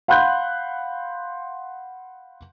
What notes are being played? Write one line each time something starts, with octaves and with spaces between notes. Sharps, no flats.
F5 F#5 B5 C6 F#6 G6